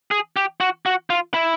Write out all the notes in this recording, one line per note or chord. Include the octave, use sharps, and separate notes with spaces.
G#4
G4
F#4
F#4
F4
E4